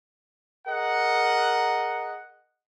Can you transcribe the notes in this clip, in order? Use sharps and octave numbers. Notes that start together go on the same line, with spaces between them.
G#4 A#4 D#5 F#5